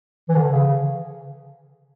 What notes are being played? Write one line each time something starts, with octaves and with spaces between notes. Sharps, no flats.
E3
D3
C#3